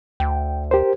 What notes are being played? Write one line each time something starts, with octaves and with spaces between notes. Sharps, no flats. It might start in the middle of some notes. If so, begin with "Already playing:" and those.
D2 G5
G4 A#4 C5